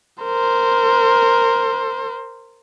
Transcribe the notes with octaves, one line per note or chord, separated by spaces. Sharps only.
A#4 C5